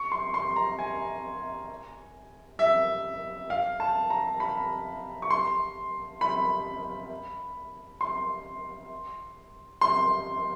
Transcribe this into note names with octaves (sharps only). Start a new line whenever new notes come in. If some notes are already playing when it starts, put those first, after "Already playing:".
Already playing: C#6
C6
C6
A#5
G#5
E5
F5
A5
A#5
B5
C#6
C6
B5
C6
C6